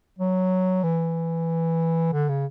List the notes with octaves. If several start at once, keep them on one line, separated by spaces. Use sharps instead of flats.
F#3
E3
D3
C#3